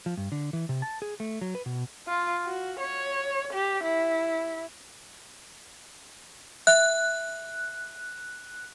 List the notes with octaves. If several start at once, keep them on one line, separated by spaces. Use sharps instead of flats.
F3
G2
D3
E3
C3
A5
G#4
A3
F#3
B4
B2
F4
F#4
C#5
G4
E4
E5 F#6